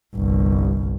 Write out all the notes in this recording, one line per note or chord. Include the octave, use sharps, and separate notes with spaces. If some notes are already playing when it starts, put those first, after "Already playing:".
G1 C2